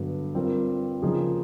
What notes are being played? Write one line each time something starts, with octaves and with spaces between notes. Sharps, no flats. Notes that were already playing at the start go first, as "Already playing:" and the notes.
Already playing: G2 D3 F#3 B3
G3 C4 F4 A#4
C#3 F3 A#3 D#4 G#4